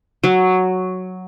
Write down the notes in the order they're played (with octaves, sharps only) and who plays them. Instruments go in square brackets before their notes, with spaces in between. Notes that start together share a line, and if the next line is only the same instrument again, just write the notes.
[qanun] F#3